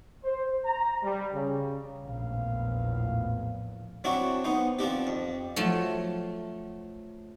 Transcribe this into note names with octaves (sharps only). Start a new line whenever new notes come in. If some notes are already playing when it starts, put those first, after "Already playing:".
C5
A#5
G3
C#3
A#1 E2 A2 F5
F#3 C4 D4 E4 F#4
B3 D#4 C5
F3 C4 D4 G4
F2
F3 F#3 A3